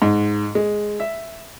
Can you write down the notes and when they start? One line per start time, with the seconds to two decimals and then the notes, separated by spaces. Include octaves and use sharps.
0.02 G#2
0.55 G#3
1.00 E5